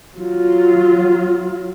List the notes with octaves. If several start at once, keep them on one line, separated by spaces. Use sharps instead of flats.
F#3 F4